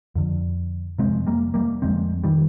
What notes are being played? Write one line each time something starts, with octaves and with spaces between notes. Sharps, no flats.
F2 D3
F2 C3 G#3 C4
G3 A#3
G3 A#3
F2 D3 G#3 C4
D#3 G3